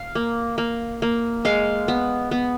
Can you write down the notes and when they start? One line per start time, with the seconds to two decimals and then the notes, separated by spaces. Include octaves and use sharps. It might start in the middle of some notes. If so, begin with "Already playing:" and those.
Already playing: F5
0.15 A#3
0.58 A#3
1.02 A#3
1.45 G#3 F5
1.88 B3
2.31 B3